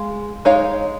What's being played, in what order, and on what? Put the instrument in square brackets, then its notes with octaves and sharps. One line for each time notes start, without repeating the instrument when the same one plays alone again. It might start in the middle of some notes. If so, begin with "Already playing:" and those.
Already playing: [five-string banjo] G#3 F5
G#3 D#4 C#5 F5